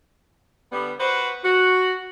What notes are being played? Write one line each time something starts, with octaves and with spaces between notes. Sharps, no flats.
D3 G3 B3
F#4 B4 C5
F#4